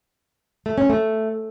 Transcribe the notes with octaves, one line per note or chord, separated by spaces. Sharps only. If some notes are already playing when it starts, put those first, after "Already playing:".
A3
C#4
A3